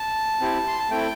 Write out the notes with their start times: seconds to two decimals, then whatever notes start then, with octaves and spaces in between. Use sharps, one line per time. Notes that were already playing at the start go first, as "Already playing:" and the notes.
Already playing: A5
0.41 C4 E4 G4
0.67 C6
0.79 A5
0.91 A3 C4 E4 G5